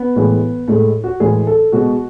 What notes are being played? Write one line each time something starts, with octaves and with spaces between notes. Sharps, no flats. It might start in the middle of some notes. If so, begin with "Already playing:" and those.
Already playing: B3
A2 E3 G#3
A2 G#3 A3
F#4
A2 E3 G#3 G#4
A4
B2 G#3 F#4